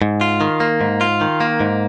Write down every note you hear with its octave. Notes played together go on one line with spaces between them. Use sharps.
G#2
F4
D#3
A#3
G#2
F4
D#3
A#3
G#2